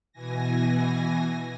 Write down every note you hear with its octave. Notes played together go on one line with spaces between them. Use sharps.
B2 E3 G#5 A#6